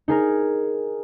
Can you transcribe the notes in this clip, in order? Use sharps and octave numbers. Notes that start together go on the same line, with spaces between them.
D#4 G#4 A#4